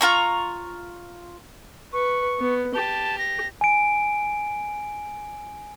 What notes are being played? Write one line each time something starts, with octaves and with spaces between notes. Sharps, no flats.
F4 A#5 C#6
B4 C#6
B3
G4 A5
A#6
G#5 D7